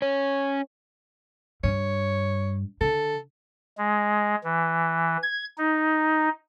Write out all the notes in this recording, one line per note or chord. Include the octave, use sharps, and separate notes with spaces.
C#4
G2 C#5
D3 A4
G#3
E3
G#6
D#4